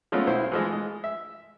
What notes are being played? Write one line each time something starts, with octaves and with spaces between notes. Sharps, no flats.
F3 G#3 A3 B3 C#4 F4
B1 E4 C5
E3 F3 G#3
G#3
E5